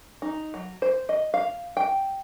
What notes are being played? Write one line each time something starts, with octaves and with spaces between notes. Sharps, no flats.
D#4
F#3
C5
D#5
F5
G5